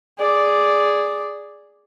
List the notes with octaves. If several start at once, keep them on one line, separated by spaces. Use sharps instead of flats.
G#4 D5